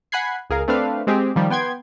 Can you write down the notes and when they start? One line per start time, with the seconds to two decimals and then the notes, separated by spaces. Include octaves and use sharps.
0.12 F#5 G#5 B5 F#6 G#6 C7
0.50 C#2 G#4 A#4 F5
0.68 A3 C4 D4 B4 F5
1.07 G#3 C4 G4 G#4
1.36 D#3 F3 G3
1.50 B3 G5 C6 G#6